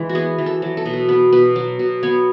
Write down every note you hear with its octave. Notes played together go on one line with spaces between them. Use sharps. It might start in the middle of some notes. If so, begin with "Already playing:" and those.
Already playing: E3 G#3
F#4
B3 G#4
E3
A4
F#3
A4
B2
B4
B3 B4
B2 B4
F#3
B2
B3 C#5